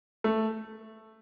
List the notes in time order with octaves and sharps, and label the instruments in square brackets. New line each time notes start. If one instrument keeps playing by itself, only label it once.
[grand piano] A3